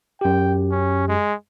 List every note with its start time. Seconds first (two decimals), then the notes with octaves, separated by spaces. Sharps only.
0.21 F#2 G4 G5
0.71 C#4
1.08 G#3